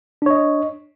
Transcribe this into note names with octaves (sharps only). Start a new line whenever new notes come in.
D4 C#5 D#5